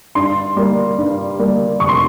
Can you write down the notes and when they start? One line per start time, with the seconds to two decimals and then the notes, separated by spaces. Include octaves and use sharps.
0.15 G2 C6
0.56 G3 A#3
0.98 G2
1.39 G3 A#3
1.80 F1 C#6
1.89 C6